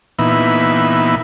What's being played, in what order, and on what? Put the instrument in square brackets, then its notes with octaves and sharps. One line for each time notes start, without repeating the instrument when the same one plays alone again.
[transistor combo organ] A#2 E3 B3 D#4 E5 B5